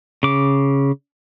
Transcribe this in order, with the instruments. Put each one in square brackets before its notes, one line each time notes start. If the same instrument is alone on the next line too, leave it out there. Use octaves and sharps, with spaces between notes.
[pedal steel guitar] C#3 D6